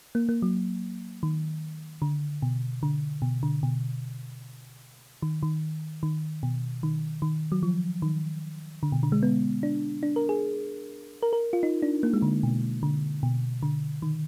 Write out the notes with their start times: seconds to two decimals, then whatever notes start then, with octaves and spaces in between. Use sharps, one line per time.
0.15 A#3
0.29 A#3
0.42 F#3
1.23 D#3
2.02 D3
2.42 B2
2.83 D3
3.22 B2
3.43 D3
3.63 B2
5.22 D#3
5.43 D#3
6.03 D#3
6.43 B2
6.83 D#3
7.22 D#3
7.52 F#3
7.63 F3
8.02 D#3
8.83 D3
8.92 B2
9.03 D3
9.12 G#3
9.23 B3
9.63 D4
10.03 D4
10.16 A#4
10.29 G#4
11.23 A#4
11.33 A#4
11.53 F4
11.63 D#4
11.82 D4
12.03 A#3
12.13 G#3
12.22 D3
12.43 B2
12.83 D3
13.23 B2
13.63 D3
14.02 D#3